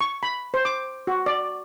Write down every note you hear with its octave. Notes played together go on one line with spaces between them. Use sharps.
C#6
B5
C5
D6
F#4
D5